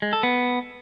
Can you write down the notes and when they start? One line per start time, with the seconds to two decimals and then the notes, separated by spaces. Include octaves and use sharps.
0.02 G#3
0.13 A4
0.23 B3